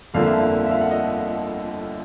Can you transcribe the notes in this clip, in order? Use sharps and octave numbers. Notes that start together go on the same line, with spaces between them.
G1 F2 D3 F3 A#3 F5
E5
F5
E5
F5
F#5
D#5